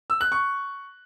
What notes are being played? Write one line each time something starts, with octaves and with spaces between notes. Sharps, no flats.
E6
F#6
C#6